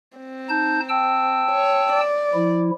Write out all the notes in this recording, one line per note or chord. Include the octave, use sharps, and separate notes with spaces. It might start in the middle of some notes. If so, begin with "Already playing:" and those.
C4
D#4 A5 G6
G5 A5 E6
C#5
D5
F3 E4